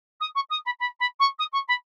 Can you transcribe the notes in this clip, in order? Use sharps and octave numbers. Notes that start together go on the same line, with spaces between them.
D#6
C#6
D#6
B5
B5
B5
C#6
D#6
C#6
B5